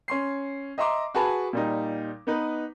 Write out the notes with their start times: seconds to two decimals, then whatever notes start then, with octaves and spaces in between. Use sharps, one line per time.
0.08 C#4 C6 C7
0.78 D#5 E5 A#5 C6 D6
1.15 F#4 G#4 B4 A5 B5
1.53 A#2 G3 D#4
2.27 B3 D#4 B4